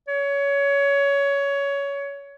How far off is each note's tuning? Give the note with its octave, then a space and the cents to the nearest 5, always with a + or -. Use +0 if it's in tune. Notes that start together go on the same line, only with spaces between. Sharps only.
C#5 +20